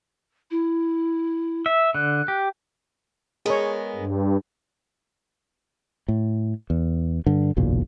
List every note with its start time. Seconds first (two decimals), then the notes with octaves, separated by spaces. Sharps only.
0.51 E4
1.66 E5
1.95 D3 F#6
2.28 G4
3.46 G#3 B3 G#4 A#4 C#5
3.96 G2
6.08 A2
6.70 E2
7.26 G2 D3
7.56 F#1 B1 E2 A#2